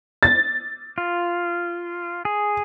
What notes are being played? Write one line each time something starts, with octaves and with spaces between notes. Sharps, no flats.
A6
F4
G#4